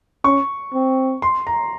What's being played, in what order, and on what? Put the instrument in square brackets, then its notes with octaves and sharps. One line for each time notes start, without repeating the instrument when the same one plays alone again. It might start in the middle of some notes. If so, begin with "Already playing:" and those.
[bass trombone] C#4 [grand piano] C#6
[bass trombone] C4
[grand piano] C6
A#5